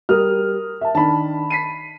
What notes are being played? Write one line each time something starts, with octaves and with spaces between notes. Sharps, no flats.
G3 A#4 D#6 F6
E5 A5
D#3 D4 A5 B5
B6 C7 D#7